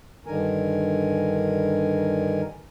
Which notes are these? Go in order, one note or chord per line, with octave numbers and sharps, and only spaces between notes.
G2 D3 D#3 A#4 G#5